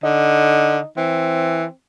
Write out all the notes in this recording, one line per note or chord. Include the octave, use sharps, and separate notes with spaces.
D3 D#4
E3 C4